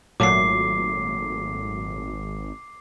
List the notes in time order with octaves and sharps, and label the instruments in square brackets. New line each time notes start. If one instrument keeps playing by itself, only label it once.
[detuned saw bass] G#1 [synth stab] A#2 F#3 A3 [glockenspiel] D6 C7